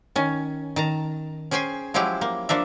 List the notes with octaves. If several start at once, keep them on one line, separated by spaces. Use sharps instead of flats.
D#3 C#4
D#3 A5 A#5
C#4 G#4 C5 G5 G#5
F3 F#3 G#3 E4 G4
A#3
F3 A#3 D4 E5